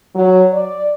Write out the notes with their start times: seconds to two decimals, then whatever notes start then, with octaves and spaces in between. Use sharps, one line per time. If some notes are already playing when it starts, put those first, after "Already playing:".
0.15 F#3
0.53 D5